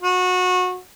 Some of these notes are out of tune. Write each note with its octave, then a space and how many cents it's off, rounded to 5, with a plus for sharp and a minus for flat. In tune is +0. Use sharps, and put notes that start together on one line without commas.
F#4 -25